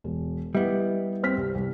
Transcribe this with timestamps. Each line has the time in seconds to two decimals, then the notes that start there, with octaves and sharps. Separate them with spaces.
0.04 E1
0.55 G3 B3 E4 D#5 E5
1.23 C4 F6 B6
1.37 C2
1.55 C2